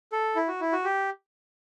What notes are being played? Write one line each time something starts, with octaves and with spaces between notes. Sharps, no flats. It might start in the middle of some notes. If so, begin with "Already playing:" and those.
A4
E4
F#4
E4
F#4
G4